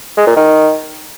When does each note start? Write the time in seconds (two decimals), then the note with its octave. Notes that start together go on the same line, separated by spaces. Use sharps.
0.17 G#3
0.27 A#2
0.37 D#3